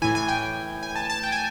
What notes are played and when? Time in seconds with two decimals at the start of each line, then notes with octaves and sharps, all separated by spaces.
0.02 A2 E3 G#5
0.15 G#5
0.28 G5
0.83 G#5
0.96 A5
1.10 A5
1.23 G5
1.32 G#5